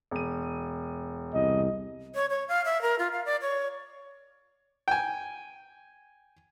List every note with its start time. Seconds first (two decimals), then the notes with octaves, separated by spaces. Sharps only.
0.11 E1 D#7
1.34 C2 D#5
2.15 C#5
2.30 C#5
2.48 F5
2.65 E5
2.82 A#4
2.99 F4
3.12 F5
3.26 D5
3.42 C#5
4.88 G5 G#5